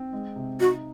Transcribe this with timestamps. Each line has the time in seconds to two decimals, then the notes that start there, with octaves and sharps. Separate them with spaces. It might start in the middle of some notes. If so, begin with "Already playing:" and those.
Already playing: C4
0.13 G#3
0.36 C3
0.60 D#4 F#4